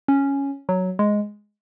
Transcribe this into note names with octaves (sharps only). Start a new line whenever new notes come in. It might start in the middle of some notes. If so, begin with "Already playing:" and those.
C#4
F#3
G#3